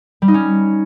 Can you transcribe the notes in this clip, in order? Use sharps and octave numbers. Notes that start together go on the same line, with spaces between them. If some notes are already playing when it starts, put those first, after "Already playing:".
G3
D#4
C#4